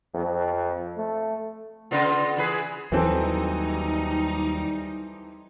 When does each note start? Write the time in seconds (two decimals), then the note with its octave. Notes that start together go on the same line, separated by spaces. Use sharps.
0.14 F2
0.97 A3
1.91 C#3 B3 F4
2.37 E3 G#4 B4
2.92 D#2 E3 F#3 G3 C4 D#4 A4